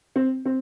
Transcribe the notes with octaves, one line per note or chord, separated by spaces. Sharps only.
C4
C4